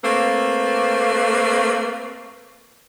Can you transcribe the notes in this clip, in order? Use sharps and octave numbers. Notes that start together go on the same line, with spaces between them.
A3 A#3 C4 B4